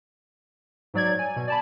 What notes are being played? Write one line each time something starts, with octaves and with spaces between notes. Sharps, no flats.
G#2 F#3 D5 G#6
G#5
B2
D5 A5 B5